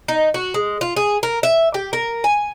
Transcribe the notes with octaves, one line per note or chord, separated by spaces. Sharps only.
D#4
F#4
G#3
F4
G#4
A#4
E5
G4
A#4
G#5